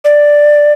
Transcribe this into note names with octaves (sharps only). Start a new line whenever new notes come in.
D5